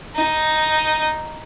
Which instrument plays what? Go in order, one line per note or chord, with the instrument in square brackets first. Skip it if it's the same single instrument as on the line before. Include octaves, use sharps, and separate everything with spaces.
[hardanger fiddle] D#4